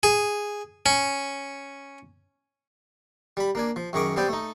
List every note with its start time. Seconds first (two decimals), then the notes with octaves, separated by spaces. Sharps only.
0.03 G#4
0.86 C#4
3.37 G3 B5
3.55 A#3 D4 G#5
3.76 F3
3.93 F#2 D#3 G#4 C#6 D6
4.16 G3 B3 C4 D5 G5
4.28 A3 D#4